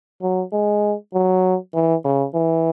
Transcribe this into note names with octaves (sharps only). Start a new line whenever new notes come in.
F#3
G#3
F#3
E3
C#3
E3